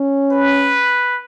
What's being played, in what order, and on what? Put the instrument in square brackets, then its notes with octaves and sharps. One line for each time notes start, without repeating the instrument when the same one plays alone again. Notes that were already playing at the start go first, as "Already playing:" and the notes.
Already playing: [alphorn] C#4
[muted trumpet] B4